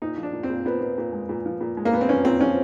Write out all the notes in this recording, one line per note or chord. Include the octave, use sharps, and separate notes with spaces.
A#2 D#4
F3
D4
A#2
C4
A#2
A#2 B3
A#2
A#2
G#3
A#2
F3
A#2
G#3
A#3
A#2 B3
C4
F3 C#4
A#2 C4
F3 C#4